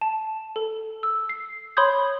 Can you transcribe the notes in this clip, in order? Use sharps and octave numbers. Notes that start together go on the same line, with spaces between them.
A5
A4
E6
C7
C#5 B5 C6 D#6 G6 G#6